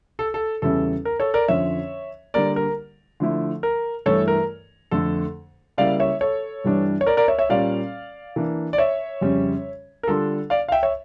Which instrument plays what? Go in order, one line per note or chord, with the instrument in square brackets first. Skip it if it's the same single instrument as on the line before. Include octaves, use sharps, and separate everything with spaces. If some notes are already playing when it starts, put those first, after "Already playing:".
[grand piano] A4
A4
E2 C#3 G3 C#4 E4 A4
A#4
A4 C#5
A#4 D5
F2 D3 F3 C#4 C#5 E5
D3 G3 A#3 A#4 D5
A#4
D3 F3 A3 E4
A#4
G2 E3 A3 E4 A4 C#5
A#4
F2 D3 A3 A4
C#3 G3 A#3 E4 D5 F5
C#5 E5
A4 C#5
G2 E3 G3 D4
C#5
A#4 D5
A#4 D5
C#5 E5
C#5 E5
A#2 G3 C#4 D5 F5
E3 A#3 D4
D5
C#5 E5
F2 C#3 G3 C#4
A#4
D3 G3 D4 F4 A4
D5 F5
F5
E5 G5
C#5 E5